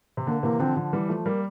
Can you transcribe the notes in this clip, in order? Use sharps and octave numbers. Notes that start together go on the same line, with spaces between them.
C3
D3 A#3
C3 E3 A#3
D3 F3 C4
D3 F3
E3 G3
F3 A3
G3 A#3